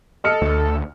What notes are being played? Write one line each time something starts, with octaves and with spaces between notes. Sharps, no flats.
A4 D#5 F6 C#7
D2